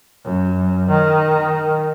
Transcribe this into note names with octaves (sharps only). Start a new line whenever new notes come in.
F#2
D#3